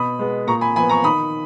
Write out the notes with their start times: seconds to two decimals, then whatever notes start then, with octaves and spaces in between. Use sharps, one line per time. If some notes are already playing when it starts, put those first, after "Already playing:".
Already playing: B2 B5 D#6
0.19 G#3 B3
0.47 A#2 A#5 C#6
0.61 G#5 B5
0.76 F3 G#5 B5
0.79 B3
0.89 A#5 C#6
1.04 D#3 B5 D#6